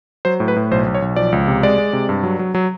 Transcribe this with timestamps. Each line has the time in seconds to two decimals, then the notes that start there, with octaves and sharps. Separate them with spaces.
0.25 F#3 C5
0.40 A2
0.48 B4
0.56 A2
0.71 B1 C5
0.86 B1
0.95 C#5
1.02 B1
1.16 F3 D5
1.32 C#2
1.48 C3
1.63 G#3 D5
1.78 G#3
1.93 C3
2.09 G2
2.23 F#3
2.39 F#3
2.55 F#3